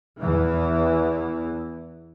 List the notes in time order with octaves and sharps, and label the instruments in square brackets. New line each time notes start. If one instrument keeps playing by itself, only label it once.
[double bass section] E2 E3